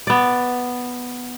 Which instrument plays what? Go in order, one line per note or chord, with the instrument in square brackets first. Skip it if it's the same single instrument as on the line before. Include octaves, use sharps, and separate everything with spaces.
[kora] B3 D5